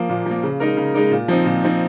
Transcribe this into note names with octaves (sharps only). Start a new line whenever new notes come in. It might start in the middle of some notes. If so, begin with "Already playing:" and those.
Already playing: F3 A#3
A#2
F3 A#3
C#3
G#3 D#4 A#4
C#3
G#3 D#4 A#4
A#2
F3 C4 D#4
A#2
F3 C4 D#4